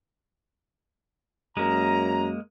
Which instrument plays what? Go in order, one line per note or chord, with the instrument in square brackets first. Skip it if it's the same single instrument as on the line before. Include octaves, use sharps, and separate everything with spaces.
[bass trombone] F#2 [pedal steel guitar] G#3 A#3 [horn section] A#5